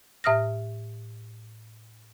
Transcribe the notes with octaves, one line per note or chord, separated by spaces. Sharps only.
A2 E5 D#6 F6 A#6